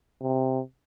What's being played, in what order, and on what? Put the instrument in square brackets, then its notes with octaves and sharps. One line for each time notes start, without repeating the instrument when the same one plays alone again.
[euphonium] C3